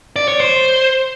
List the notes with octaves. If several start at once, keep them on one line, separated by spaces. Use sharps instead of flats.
D5
C#5
C5